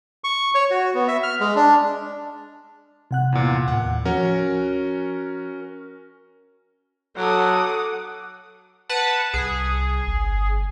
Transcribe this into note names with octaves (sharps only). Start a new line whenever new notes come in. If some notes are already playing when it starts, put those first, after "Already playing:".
C#6
C#5
F#4
B3
E5
F6
G#3
D4
C3 F#5 F#6
E2 A#2
D#2 A2 F#5
F3 C#4 F#4 A#4
F#3 A4 F#5 D6 D#6
B4 F#5 A5
C2 G#4
G1